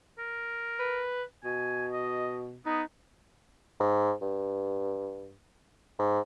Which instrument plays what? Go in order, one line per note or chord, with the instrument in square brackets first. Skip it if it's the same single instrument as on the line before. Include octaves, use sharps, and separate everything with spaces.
[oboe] A#4
[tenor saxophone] B4
[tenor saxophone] B2 [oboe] G#5
[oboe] D#5
[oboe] B3 [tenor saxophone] D#4
[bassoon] G#2
G2
G#2